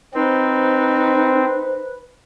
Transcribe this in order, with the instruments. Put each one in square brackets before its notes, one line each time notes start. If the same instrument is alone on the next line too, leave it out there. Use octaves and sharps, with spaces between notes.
[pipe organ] C4 [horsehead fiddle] D#4 [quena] B4 [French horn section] C5